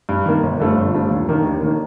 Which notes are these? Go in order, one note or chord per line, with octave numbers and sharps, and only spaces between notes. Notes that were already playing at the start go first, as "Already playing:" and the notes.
G2
D#3 A#3
G1
G2 F3 A3 D4
G1
G2 F3 A3 D4
D#2
D#3 A#3 D4
D#2
D#3 A#3 D4